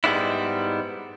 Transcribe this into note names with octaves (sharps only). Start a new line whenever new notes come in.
G#2 G3 G#3 B3 D4 E4